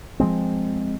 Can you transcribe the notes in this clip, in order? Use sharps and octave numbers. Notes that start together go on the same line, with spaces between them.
F3 G#3 C4